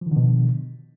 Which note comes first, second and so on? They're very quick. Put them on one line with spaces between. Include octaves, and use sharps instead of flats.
F3 D#3 D3 B2